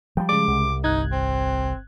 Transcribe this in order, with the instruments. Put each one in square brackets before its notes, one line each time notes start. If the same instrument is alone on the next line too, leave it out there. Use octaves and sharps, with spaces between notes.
[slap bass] F3 G3 [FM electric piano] G5
[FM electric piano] C#3 G#3 [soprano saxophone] D6
[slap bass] C2
[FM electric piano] G1 F#6 G#6 [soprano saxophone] D#4
[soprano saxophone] C4